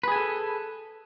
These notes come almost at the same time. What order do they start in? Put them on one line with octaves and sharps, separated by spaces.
B4 G#4 G#5 A4